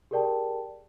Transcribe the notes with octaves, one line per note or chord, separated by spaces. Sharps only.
G4 G#4 A#4 D5 G5 A5